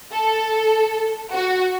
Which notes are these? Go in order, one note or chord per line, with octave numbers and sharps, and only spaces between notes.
A4
F#4